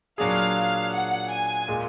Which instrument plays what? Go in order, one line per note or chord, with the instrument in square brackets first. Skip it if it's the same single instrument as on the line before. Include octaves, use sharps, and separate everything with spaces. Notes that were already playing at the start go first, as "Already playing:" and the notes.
[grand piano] A#2 F#3 D4 G#4 [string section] F5
[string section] F#5
G#5
[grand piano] A#2 G#3